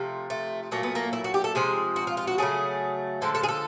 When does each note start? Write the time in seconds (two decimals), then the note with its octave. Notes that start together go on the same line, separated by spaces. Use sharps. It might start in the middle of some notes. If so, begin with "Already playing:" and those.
Already playing: C3 F3 A3
0.30 A3
0.71 A#2 F#3 A3 A#3
0.83 B3
0.95 A#3
1.13 E4
1.24 F#4
1.34 G4
1.44 A4
1.55 C3 F3 G#3 G#4
1.96 F#4
2.07 F4
2.17 F4
2.27 F#4
2.38 C#3 F#3 A3 G#4
3.22 D3 F3 G#3 A4
3.35 A4
3.43 G#4
3.49 A4